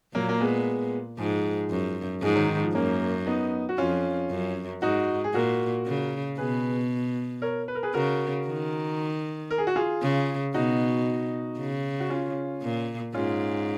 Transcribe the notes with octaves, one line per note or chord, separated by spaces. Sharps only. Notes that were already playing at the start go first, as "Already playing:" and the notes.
A#2 F#3 A#3
A#3
G#3 B3
G#2 F3 G#3
F#2
G#2 F3 G#3
D#3 F#3
D#3
F3
F#2 A#3 C#4
B3 D#4
F#4
F2 C#4 F4
F#2
G#2 D#4 F#4
G#4
A#2 F#4 A#4
C#3
B2 G#4 B4
A#4 C#5
B4
A#4
G#4 B4
C#3 F#4 A#4
D#3
A#4
G#4
F#4
F4 G#4
C#3
B2 D#4 F#4
C#3
F#4
C#4 F4
A#2
G#2 C#4 F4